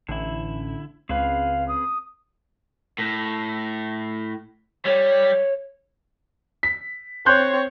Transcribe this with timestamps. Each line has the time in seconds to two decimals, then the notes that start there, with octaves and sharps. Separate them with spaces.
0.09 A1 D3 E4
1.09 C#2 C4 G#4 B4 F5
1.68 D#6
2.98 A2
4.85 G3 C#5
6.63 B6
7.26 C4 C#5 C6 F#6 G6